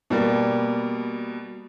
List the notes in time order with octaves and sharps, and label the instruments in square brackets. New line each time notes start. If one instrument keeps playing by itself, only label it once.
[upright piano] B2 G3 A#3